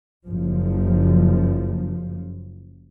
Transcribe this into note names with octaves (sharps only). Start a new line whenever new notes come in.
F#1 F3